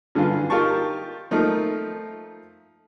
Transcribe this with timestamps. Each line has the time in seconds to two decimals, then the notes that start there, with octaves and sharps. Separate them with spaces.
0.15 G2 D3 E3 F4
0.50 D#4 F4 G4 A#4 A5 C#6
1.31 F3 A3 D#4 A#4